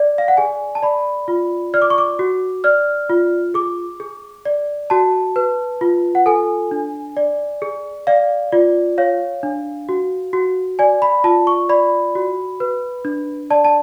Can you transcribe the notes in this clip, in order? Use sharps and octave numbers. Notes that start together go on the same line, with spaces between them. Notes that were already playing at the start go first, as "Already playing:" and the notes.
Already playing: D5
F5
F#5
G#4 G#5
A5
D5 B5
F4
D5 F6
D6
C#6
D6
F#4
D5 F6
F4
G#4 D6
G#4
D5
F#4 A5
B4
F4
F#5
A4 G#5
D4
D5
G#4
D5 F5
F4 D5
C#5 F5
D4
F#4
F#4
D5 G#5
B5
F4 A5
C#6
D5 B5
F#4
B4
D4
D5 A5
A5